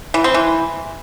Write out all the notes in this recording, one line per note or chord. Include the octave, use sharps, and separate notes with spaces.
E3
C4
E3